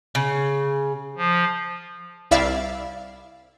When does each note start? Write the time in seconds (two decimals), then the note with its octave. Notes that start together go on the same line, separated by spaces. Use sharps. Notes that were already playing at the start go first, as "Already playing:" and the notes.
0.15 C#3
1.17 F3
2.31 C2 E4 D5 E5 F5